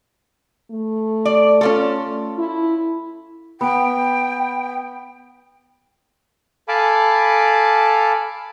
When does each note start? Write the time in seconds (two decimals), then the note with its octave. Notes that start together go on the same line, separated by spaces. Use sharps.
0.71 A3
1.25 D5
1.61 C#4 F4 A4
2.38 E4
3.61 B3 G5
6.68 A4 F5 G#5 A5 B5 D6